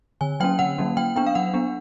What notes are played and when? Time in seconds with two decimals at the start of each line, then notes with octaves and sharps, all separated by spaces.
0.21 D3 G#5
0.40 F#3 A#3 C#4 G5
0.59 D3 F#5
0.78 F#3 A#3 C#4
0.97 F#3 G5
1.16 B3 D4 G5
1.26 F5
1.35 F#3 F#5
1.54 B3 D4